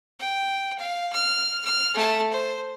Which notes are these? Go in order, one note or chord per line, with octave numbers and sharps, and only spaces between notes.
G5
F5
F6
F6
A3 A5
C5